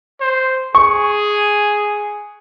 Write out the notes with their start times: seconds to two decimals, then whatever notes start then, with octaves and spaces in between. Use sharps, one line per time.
0.21 C5
0.75 G#4 C#6